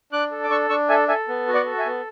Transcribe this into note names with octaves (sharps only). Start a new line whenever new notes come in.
D4 D6 F#6
A4
D6
D4 C#6 E6
D4 C#6 E6
A4 E5 G#5
A4 E5 G#5
B3
F#4
D5 F#5
A4
E5 G#5
B3